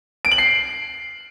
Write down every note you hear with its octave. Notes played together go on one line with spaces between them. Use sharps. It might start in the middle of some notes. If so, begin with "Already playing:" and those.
D7
F#7
C7